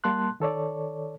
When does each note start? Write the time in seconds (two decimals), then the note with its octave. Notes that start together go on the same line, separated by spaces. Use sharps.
0.04 G3 A#3 A5 C6 F#6
0.40 D#3 A4 C#5 D5